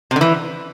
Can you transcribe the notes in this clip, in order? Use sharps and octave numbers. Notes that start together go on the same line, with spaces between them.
C3
D3
E3